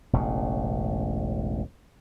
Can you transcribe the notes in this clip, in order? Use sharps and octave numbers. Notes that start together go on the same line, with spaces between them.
E1 A1 C#3